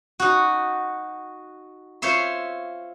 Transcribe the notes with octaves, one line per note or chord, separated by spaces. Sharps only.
D#4 F#4
F4 C5 C#5 E5 C6